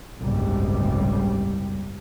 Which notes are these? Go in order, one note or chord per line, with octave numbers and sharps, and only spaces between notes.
F#1 C2 G#2 B2 G3